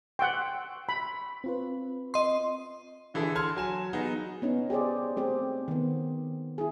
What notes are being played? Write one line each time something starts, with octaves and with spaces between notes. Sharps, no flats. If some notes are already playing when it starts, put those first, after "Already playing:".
F#5 G5 C6 C#6 E6
B5
C4 F4 B4
D#5 C6
D3 E3 E4 G#4 A4
A5 C6 F6 G#6
F#3 G#5 E7
F#3 B3 D#4 G#4
B3 C#4 D#4
G4 G#4 C5 D5
A3 C4 G4 G#4
D#3 B3
E4 G#4